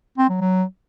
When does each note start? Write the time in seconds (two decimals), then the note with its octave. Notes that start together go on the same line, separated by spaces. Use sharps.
0.18 C4
0.29 F#3
0.41 F#3